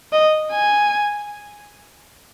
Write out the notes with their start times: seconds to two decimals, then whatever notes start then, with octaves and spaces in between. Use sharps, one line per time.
0.13 D#5
0.52 G#5